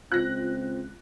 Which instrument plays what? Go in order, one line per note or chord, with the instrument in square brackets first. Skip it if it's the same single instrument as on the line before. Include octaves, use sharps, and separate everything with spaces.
[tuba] C#2 [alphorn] C4 [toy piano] F4 [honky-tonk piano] F#6 A#6